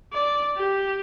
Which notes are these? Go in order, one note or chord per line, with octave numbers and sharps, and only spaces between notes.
D5
G4